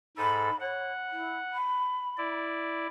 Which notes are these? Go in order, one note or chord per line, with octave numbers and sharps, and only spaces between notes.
G#2 A4 B5
C#5 F#5
E4
B5
E4 D5